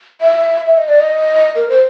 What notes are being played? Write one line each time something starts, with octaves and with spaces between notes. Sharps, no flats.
E5
E5
D#5
D5
D#5
A#4
C5